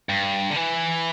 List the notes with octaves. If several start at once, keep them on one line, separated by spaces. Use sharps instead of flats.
G2
D3
E3